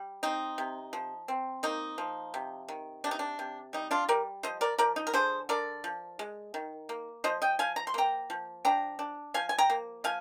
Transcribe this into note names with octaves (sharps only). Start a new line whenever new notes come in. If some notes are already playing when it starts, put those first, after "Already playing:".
Already playing: G3
C4 D#4
C3
F3
C4
A#3 D#4
F3
C3
D#3
C3 D4
D#4
D4
C3
G3 D#4
D4 F4
G3 A#4 D5
F3 C5 D#5
A#4 D5
F3 A#4 D5
D#4
A#4
D3 G#4 C5
D3 A#4 D5
F3
G#3
D#3
A#3
F3 C5 D#5
D#5 G5
F3 F5 G#5
A#5
C6
A#3 G5 A#5
F3
D4 G5 A#5
D4
F3 F5 G#5
G#5
G5 A#5
A#3
F3 F5 G#5